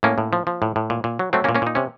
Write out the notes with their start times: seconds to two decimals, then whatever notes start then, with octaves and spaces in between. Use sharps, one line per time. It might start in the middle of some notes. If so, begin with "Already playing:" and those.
0.03 A2 A#3 C#4
0.18 A2
0.33 F3
0.47 F3
0.62 A2
0.76 A2
0.90 A#2
1.04 A#2
1.19 F#3
1.33 F#3 A3 C4
1.44 A#3 C#4
1.49 A#2
1.55 A#3 C#4
1.62 A#2 D#4
1.75 C3 C#4